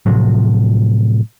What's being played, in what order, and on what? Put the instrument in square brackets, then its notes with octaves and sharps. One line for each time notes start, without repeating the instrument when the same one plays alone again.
[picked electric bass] A2 C3 F3 F#3